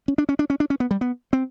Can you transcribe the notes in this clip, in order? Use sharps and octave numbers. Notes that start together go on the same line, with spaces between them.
C#4
D4
C#4
D4
C#4
D4
C#4
B3
G3
B3
C4